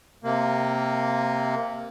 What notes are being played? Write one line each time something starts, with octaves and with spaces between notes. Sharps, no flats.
C3 A#3